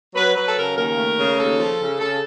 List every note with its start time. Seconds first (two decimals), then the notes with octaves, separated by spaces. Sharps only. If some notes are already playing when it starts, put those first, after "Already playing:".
0.15 F#3 B4
0.35 F#3 B4
0.47 A4
0.57 C#3 A#4
0.77 D#2 A#4
0.97 A3
1.17 C#3
1.38 D#2 A4
1.59 F3
1.80 C#3
2.00 C#3 A4